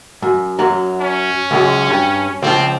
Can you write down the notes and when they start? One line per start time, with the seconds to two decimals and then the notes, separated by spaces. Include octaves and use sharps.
0.22 F#2
0.59 F#2 F#3
1.01 C#4
1.51 C#2 F#2 G#3
1.90 G2
2.42 C#2 F3 C4